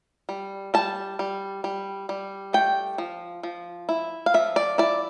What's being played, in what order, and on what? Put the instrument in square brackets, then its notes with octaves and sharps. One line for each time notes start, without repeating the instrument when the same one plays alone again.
[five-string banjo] G3
G3 A5
G3
G3
G3
A3 G5
F3
F3
E4
F5
F3 E5
D5
E4 D5